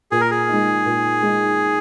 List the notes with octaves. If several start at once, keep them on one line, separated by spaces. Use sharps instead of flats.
A#2 G#4
A#4
G#4
G#3 D#4
A#2
G#3 D#4